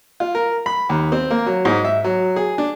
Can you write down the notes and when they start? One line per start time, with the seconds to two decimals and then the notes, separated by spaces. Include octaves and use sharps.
0.20 F4
0.35 A#4
0.66 B5
0.89 D#2
1.12 C4
1.31 A#3
1.46 F#3
1.65 G#2
1.85 E5
2.04 F#3
2.36 G#4
2.58 D4